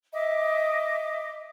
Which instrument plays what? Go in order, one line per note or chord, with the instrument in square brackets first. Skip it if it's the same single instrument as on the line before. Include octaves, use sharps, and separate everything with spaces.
[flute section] D#5 E5 D6